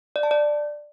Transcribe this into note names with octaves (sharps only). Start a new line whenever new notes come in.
D5
A5
D5